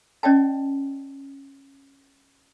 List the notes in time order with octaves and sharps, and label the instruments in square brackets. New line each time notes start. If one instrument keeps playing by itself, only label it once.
[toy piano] C#4 D5 D#5 G5 A5